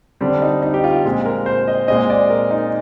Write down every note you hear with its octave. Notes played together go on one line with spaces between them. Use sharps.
D3 G3 C4 D4
D#4
D#4
G4
F4
A#2 G#3 C4
A#4
C5
D#5
A#2 G#3 C4 D#5
D5
A#4
D#4